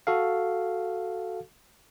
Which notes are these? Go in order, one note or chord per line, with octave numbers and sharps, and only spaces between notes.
F#4 A4 F5